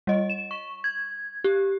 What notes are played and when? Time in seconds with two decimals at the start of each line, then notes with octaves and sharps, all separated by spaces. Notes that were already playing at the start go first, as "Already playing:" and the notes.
0.07 G3 D#5
0.30 E7
0.51 C#6
0.84 G#6
1.44 G4